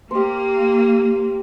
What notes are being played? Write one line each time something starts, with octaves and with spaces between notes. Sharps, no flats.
A#3 G4 C5